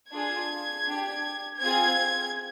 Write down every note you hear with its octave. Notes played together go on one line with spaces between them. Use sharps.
D4 F4 G#4 G#6
D4 G4
C4 F4 G#4 G#6